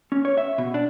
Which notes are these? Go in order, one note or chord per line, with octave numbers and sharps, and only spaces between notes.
C#4
C#5
E5
B2
D4